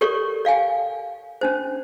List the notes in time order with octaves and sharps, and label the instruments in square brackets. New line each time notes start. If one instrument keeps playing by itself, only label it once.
[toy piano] G4 A4 A#4 C#5 D5 C#6
D5 F5 G5 G#5
C#4 D4 C5